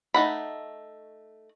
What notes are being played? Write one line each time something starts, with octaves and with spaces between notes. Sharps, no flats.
A3 D#4 F#5 B5